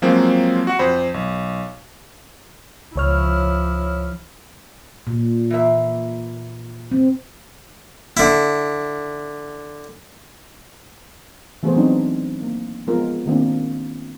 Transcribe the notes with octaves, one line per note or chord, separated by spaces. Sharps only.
F3 F#3 G#3 A#3 C4 F4
F#4 F#5
F2 C5 B5
B1
C#2 F3 E4 C#5 F6
A#2
E3 A#3 E5
C4
D3 E4
E3 A3 B3 F#4 G#4 C5
F#3 B3 C4 D4 D#4
A#3
F3 G#3 B3 F4 A#4
D#3 A#3 C4 D4